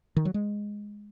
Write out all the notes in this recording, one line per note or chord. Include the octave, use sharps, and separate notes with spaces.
D#3
F#3
G#3